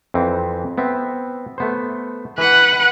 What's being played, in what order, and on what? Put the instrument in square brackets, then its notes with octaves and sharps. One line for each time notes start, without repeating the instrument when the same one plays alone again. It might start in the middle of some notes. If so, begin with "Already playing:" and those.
[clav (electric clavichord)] F2 E3 C4
B3 C4 E5
A3 B3 C5
[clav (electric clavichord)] E3 [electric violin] B4 F#5